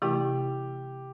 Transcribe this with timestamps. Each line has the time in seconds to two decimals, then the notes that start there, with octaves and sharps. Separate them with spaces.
0.02 C3 E3 A3 E4 G4